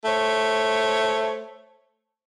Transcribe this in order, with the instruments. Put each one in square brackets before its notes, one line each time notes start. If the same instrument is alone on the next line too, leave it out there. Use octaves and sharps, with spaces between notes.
[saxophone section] A3 C5 C#5